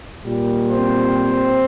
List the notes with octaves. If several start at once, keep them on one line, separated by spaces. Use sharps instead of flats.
A#2 G3 A#3
C4 C5